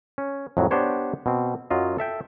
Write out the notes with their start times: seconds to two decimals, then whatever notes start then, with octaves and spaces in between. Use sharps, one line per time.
0.18 C#4
0.57 F2 A2 D#3 F#3
0.71 B3 D4 G4 C5 C#5
1.26 B2 C4
1.70 F#2 F#3 F4 D#5
1.98 A4 E5 G5